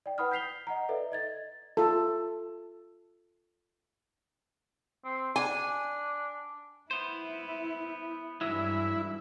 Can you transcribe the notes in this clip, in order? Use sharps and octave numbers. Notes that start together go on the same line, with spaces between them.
D5 G5
B4 F#5 B5 D#6 F6
G6 B6 C7 F7 G7
D#5 F#5 A#5
A4 B4 D5 E5
D#5 G#6 A6
F4 A4
C4
D4 G#5
B3 E4 C5
G2 E3 F#3 G#3 E4